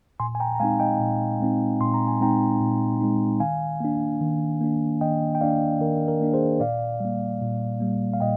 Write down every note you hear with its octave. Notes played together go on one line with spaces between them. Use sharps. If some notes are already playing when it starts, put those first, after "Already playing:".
A#2 G#5 C6
G#5
G5 A#5
A#5
G#3 C4 D#4 F5 G#5
D#5 G5
A#2
G#3 C4 D#4
A#2 C6
A#5
G#5
G#3 C4 D#4 G5 A#5
A#2
G#3 C4 D#4
D#3 F5 G#5
A#3 D4
D#3
A#3 D4
D#3 D#5 G5
G5
A#3 D4 D5 F5
D#3 A#4
A#4
A#3 D4
G#4 C5
A#2 D5 F5
G3 A#3
A#2
G3 A#3
F5
A#2 D#5 G5